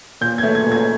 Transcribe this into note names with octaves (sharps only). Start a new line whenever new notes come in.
A#2 G6
G#6
A3
G#6
A#2
G#6